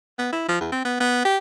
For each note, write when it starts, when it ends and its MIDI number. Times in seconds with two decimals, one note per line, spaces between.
0.19 0.29 59
0.32 0.45 64
0.48 0.58 53
0.61 0.71 40
0.72 0.80 60
0.85 0.99 59
1.00 1.22 59
1.25 1.38 67